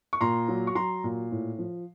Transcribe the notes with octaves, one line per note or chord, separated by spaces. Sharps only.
C#6
A#2 A#5 C6
F#3
C#6
F#3 A#5 C6
A#2
A2
F3